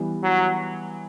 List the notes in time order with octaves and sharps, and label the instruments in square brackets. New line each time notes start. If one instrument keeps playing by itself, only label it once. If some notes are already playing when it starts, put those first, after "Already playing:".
Already playing: [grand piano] E3 G3 B3
[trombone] F#3